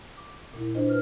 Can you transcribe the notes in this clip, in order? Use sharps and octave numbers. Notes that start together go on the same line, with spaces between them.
D6
A#2 E4
D4 F4 C5 D#5
B4 F6